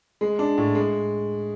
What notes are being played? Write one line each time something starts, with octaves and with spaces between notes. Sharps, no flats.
G#3
D4
A2
G#3